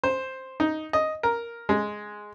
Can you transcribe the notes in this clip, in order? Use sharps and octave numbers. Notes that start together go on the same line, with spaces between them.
C5
D#4
D#5
A#4
G#3